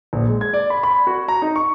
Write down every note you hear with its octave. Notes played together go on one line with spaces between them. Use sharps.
A#1
G#3
G#6
D5
B5
B5
F#4
A#5
D#4
C#6